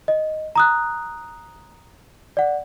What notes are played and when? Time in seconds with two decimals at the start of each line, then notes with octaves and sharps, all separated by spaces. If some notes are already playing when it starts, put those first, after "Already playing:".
0.08 D#5
0.56 A#5 D#6 F#6
2.37 D5 F#5